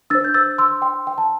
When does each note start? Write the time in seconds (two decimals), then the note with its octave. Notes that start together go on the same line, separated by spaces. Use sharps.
0.10 D4 C5 E6 A6
0.24 G6
0.34 E6 A6
0.58 C6 E6
0.82 G5 C6
1.07 G5
1.18 A5